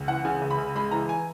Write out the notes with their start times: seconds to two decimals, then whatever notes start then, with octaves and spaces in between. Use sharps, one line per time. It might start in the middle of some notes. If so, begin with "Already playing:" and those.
Already playing: C#2
0.08 E3 F#5
0.25 C#3 G#5
0.42 C#2
0.51 B5
0.58 C#2
0.76 G#3 B5
0.91 E3 A#5
1.09 G#5